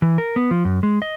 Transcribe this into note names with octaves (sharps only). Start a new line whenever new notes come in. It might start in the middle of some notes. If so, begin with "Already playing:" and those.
E3
A#4
B3
F3
F#2
G#3
D#5